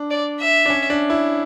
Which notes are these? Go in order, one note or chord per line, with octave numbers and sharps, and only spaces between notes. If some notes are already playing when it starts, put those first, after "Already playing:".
Already playing: D4
D5
E5
D4
C#4
D4
E4